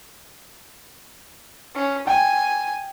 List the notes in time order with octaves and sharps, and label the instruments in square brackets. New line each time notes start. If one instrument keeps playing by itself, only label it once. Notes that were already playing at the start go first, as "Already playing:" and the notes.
[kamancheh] C#4
[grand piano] G5 [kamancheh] G#5